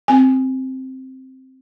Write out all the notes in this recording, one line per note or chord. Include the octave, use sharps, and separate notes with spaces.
C4 G#5